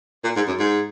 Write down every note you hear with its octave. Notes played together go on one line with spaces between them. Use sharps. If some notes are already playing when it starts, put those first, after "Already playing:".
A#2
G#2
F#2
G#2